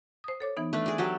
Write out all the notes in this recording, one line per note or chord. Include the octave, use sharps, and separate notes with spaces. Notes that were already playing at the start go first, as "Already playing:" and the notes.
C5 D#6
A4 C#5 D6
E3 B3 D#4
A3 D4 B4
G#4 D5
F#3 G4 A4